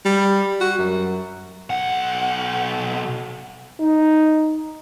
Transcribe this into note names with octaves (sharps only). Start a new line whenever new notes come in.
G3
F#4
F#2
B1 F#5
D#4